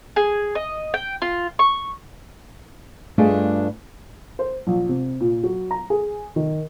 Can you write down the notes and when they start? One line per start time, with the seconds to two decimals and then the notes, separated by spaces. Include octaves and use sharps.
0.16 G#4
0.55 D#5
0.94 G5
1.22 F4
1.59 C#6
3.18 G2 A3 D4 F4 G#4 D#5
4.39 C5
4.67 A#1
4.89 C3
5.21 A#2
5.43 F#3
5.71 A#5
5.90 G#4
6.36 D#3